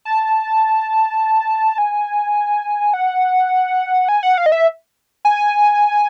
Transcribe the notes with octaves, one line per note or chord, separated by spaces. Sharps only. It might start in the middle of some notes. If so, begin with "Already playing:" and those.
A5
G#5
F#5
G#5
F#5
F5
D#5
E5
G#5